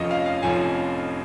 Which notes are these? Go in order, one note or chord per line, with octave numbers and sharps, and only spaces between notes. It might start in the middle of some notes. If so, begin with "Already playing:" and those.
Already playing: F1 F2 F3 C#4 F4 C#5 D#5
F5
F5
F1 F2 F3 C#4 F4 G#5